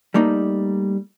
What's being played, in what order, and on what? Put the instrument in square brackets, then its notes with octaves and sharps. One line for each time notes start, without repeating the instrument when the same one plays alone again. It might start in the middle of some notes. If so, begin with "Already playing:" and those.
[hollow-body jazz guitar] G3 A3 A#3 D#4